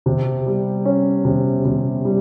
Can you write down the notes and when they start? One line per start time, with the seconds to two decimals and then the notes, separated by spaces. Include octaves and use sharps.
0.06 C3
0.46 G3
0.85 C#4
1.25 C3
1.65 C3
2.05 G3